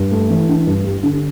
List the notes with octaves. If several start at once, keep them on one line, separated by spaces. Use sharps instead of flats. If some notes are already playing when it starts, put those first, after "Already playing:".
Already playing: G2
A3
E3
D4
G2
G3
D3